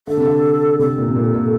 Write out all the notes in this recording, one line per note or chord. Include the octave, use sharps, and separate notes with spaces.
D3 A4
C3
D3
C3 A4
A#2
C3
A#2
A#2